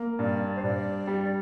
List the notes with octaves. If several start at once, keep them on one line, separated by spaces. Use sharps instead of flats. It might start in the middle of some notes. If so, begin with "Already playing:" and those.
Already playing: A#3
G2 D5
C5
G2 D5
G3